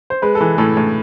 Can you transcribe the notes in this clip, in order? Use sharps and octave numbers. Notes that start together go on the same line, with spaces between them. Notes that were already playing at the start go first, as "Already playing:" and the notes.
C5
G#3 B4
A4
E3 B4
A2 A4
A2